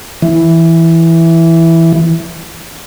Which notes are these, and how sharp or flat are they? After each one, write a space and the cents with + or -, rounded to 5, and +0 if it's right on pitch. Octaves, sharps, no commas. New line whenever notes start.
E3 +0